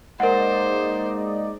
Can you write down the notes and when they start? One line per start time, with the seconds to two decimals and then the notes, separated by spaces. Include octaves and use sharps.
0.20 G#3 A#3 D#4 A#4 C5 D5 D#5 F#5